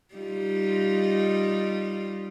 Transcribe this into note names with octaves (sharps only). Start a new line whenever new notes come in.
G3 D#4 F4